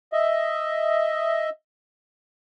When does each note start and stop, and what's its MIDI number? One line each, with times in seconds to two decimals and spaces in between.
0.13 1.49 75
0.13 1.49 76